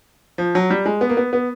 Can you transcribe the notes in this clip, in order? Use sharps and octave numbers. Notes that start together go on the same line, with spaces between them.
F3
F#3
G3
G#3
B3
A#3
B3
B3